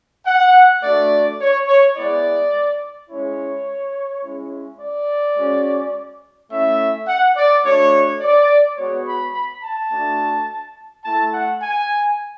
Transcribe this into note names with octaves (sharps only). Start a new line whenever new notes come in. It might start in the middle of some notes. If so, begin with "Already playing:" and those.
F#5
A3 D4 F#4 D5
C#5
C#5
G#3 B3 E4 D5
G#3 C#4 E4 C#5
G#3 C#4 E4
D5
G#3 C#4 F#4
A3 C#4 E4 E5
F#5
D5
A3 D4 F#4 C#5
D5
G#3 B3 F#4 C#5
B5
B5
A5
A3 D4 F#4
A3 E4 A5
F#5
G#5